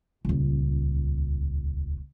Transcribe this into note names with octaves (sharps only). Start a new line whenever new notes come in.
D#1 C#2